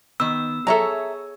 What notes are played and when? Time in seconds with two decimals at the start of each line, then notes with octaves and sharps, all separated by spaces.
0.20 D#3 B3 E6
0.67 G#4 A4 C#5 E5 A#5